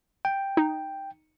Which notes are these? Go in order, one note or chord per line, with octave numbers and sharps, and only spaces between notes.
G5
D#4